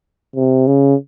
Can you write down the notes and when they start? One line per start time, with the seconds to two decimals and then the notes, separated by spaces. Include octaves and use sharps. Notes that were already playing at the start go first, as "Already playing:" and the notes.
0.36 C3
0.67 C#3